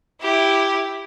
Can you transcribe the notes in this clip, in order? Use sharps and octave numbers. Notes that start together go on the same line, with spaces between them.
E4 G4